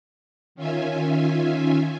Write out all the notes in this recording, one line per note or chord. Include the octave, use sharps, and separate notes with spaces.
D#3 C#4 F4 E5 G#5